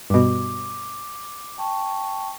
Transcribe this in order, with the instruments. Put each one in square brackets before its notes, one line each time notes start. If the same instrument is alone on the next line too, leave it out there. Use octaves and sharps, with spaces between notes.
[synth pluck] G2 B2 [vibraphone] D6
[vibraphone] G5 A5 C#6